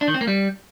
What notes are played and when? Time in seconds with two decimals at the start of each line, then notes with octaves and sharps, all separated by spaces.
0.01 D4
0.08 D#3
0.14 C4
0.21 A#3
0.27 G3